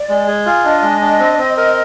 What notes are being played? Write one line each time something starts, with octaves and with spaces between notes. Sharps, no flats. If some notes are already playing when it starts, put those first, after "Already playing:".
Already playing: D5
G#3
G#4
F4
D4 D#5
G#3
D4
C4
C4
A#4